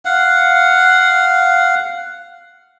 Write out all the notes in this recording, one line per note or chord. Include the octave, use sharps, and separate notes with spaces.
F5 F#5